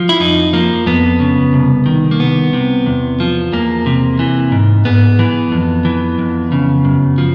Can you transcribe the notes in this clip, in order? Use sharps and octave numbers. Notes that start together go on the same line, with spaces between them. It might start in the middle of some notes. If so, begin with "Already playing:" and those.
Already playing: F3
E4
F2 D#4
F3 A#3
F2 B3
C#3
C2
D#3
A#3
C2 B3
C3
E2
F3
E2 A#3
C3
E3
G#2
G#2 B3
E3
F2
E3
F2
C#3
F#2
F3